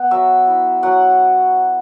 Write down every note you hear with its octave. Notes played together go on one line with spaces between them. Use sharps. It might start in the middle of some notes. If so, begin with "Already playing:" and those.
Already playing: B3 F#5
F#3 E5
E4
F#3 F#5